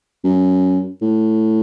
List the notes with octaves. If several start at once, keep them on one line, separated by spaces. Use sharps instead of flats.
F#2
A2